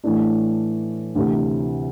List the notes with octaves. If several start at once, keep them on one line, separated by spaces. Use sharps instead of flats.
A2 E3 A3 D4
D2 C3 E3